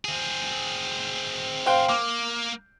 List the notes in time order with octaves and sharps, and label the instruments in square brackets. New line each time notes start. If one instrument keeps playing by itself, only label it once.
[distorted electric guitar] C4 G#4
[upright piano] C5 F5 G5
[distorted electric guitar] A#3 [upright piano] D6